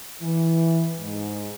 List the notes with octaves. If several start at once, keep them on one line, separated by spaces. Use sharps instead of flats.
E3
G#2